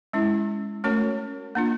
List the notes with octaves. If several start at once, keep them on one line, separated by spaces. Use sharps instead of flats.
G#3 C#4 E4
A3 C#4 F#4 A#4 C#5
A#3 D4 F4